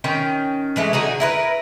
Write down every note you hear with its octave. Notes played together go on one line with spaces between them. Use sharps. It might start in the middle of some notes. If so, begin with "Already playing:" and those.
D#3 C#4 G5
E3 G#3 A3
D3 D#4 F#4 G#4
E4 A#4 B4